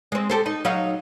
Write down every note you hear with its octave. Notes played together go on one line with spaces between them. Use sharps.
G#3 C4
G4 A4 C5
D#4
F#3 D#4 F5